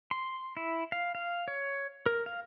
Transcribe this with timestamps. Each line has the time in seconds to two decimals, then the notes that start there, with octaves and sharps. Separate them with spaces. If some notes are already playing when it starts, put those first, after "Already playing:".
0.11 C6
0.57 E4
0.92 F5
1.15 F5
1.48 C#5
2.06 A#4
2.26 F5